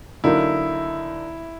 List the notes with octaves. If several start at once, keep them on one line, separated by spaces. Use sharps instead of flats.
D3 F#3 A#3 D#4 E4